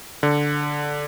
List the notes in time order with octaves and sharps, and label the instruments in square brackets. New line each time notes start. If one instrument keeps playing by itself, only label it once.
[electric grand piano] D3